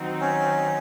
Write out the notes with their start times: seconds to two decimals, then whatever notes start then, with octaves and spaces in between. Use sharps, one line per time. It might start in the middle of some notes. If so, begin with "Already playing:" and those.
Already playing: D#3 F#3 C4 D#4 F#4
0.21 C#4